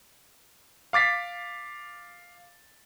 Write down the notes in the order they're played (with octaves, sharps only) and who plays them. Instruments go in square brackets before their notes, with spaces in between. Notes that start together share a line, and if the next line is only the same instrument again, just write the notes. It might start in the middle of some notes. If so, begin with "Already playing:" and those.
[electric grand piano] F5 D6 A6 B6 C7